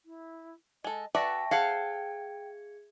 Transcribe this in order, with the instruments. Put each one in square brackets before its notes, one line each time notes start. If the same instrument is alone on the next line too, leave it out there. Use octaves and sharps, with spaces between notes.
[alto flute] E4
[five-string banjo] G#3 A4 [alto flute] D#5
[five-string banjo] F#4 B4 D5 [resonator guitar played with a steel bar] E5 [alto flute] G5 [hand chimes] A5 C#6 A#6
[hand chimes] G#4 G#6 C#7 [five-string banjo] A4 C5 F#5 [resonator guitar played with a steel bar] F5